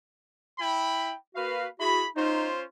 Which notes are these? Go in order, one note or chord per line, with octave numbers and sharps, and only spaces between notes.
E4 G5 B5
A#3 F#4 B4 F5
E4 F#4 G#4 B5
C#4 D#4 F4 C5